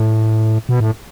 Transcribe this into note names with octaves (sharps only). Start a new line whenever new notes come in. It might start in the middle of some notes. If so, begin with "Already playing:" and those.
Already playing: A2
B2
A2